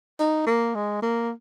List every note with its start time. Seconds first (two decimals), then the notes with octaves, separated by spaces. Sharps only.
0.20 D#4
0.47 A#3
0.75 G#3
1.02 A#3